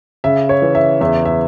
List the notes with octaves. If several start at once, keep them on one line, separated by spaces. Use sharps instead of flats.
C#3 E5
C#5
E3
E5
E2 E5
E5